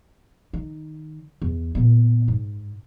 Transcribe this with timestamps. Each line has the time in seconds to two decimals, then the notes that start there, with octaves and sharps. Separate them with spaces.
0.53 D#3
1.42 E2
1.75 A#2 B3
2.28 G#2